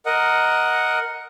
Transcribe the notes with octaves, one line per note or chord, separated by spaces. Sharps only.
A#4 D#5 F#5